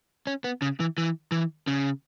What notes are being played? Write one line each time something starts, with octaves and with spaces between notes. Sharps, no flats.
C#4
B3
C#3
E3
E3
E3
C#3